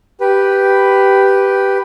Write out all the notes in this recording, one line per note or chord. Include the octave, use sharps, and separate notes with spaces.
G4 B4